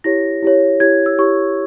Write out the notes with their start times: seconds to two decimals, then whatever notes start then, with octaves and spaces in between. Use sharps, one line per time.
0.04 E4 G4 C#5 A#6
0.42 E4 G4 C#5
0.80 E4 G4 C#5 G#6
1.06 E6
1.18 E4 G4 C#5 C#6